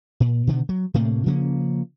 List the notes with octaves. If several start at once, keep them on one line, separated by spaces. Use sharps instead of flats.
A#2
B2 D3 D#3
F#3
A2 C3 A3 A#3
C#3 F3 A#3 C#4